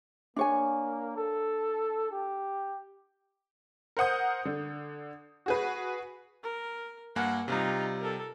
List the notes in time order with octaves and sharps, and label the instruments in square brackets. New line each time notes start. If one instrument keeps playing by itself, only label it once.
[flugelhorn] A#3 [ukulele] D4 C#5 G#5
[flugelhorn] A4
G4
[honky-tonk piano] A#4 C5 F#5 D#6 G6
D3
F#4 G#4 B4
[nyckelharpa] A#4
[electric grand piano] G2 A#3 G#5 [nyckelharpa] F#5
[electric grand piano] C3 G3 [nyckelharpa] D#4 F4
[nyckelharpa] A4 A#4